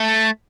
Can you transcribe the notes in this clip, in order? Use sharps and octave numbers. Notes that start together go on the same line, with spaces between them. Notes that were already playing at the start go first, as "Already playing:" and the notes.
Already playing: A3